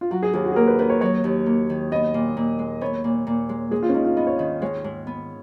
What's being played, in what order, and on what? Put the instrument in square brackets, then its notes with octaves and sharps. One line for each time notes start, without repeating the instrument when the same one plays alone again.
[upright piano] F4
[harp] F#3 [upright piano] F#4
[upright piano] G#4
[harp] D#2 [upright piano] G#4
[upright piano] F#4
G#4
[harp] A#3 [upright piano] A#4
[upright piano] B4
[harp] D#3 [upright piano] B4
[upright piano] C#5
[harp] F#3 [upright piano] C#5
[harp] D#2
A#3
D#3
[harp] B3 [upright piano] D#5
[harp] A#2
A#2
G#3
[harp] B3 [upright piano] C#5
[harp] A#2
A#2
G#3
[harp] G#3 [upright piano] G#4
[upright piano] F4
C#4
[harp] G#2 [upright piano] D#4
[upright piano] F4
[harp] B3 [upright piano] D#5
[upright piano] C#5
[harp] D#3 [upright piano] D#5
[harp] G#3 [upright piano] C#5
[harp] G#2
B3